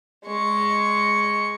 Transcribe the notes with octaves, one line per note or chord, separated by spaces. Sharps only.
G#3 C#6